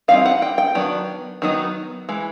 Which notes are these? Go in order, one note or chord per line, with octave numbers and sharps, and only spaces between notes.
E3 G3 C4 D#4 F5
F#5
G5
G5
D#3 F#3 B3 D4
D#3 F#3 B3 D#4
E3 G#3